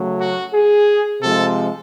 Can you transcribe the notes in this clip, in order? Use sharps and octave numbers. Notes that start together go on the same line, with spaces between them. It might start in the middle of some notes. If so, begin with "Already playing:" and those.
Already playing: C#3 F#3 A3
F#4
G#4
C3 F3 G#3 A4